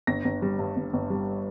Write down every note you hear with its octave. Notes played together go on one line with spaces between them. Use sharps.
G1 A#6
G1
G3
G2
G1
G1
G3